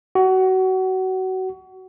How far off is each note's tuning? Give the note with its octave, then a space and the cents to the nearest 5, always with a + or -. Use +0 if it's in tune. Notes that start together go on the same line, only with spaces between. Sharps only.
F#4 +25